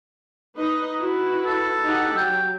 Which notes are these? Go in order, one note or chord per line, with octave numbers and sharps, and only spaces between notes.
D#4 B4 D#5
E4 F#4 B4
A4
D#4 G4 F#5
F#3 G5